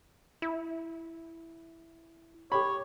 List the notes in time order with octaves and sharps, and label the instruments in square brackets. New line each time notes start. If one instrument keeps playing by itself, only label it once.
[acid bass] E4
[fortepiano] G4 B5 [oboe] C#5